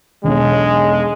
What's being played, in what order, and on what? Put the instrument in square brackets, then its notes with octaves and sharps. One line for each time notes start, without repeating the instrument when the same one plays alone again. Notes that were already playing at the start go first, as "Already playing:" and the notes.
[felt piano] E1 B1 [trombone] G#3